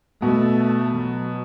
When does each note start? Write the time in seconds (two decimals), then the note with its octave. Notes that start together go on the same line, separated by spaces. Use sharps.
0.21 B2 A3
0.95 F#3